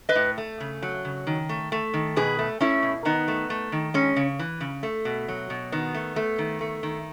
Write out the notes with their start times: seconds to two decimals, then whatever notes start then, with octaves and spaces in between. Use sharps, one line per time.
0.09 B4 D#5
0.15 A2
0.38 A3
0.60 C#3
0.82 F#3
1.05 C#3
1.27 D#3
1.49 A3
1.72 A3
1.94 D#3
2.16 B2 G#4 B4
2.39 A3
2.61 A3 C#4 E4
2.82 B2
3.05 D#3 B3 D#4
3.28 A3
3.50 A3
3.72 D#3
3.94 G#3 C#4
4.16 C#3
4.39 E3
4.60 C#3
4.83 A3
5.05 B2
5.28 F#3
5.50 B2
5.72 D#3 B3
5.94 A3
6.16 A3
6.38 D#3
6.61 A3
6.83 D#3